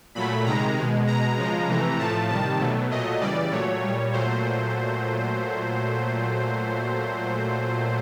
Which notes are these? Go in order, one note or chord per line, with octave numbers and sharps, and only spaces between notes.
A#2 F#3 A3 B5
C3 D#3 G#3 A#5
B2 G#3
B2 G#3 A#5
C#3 F3 G#3
C3 E3 A3
A2 F3 A3 A5
C3 D#3 G3 A5
B2 F#3 A3
A#2 F#3 A3 D#5
C#3 E3 G3 D5
A#2 F#3 A3 C#5
A#2 G3
A#2 F#3 A3 C5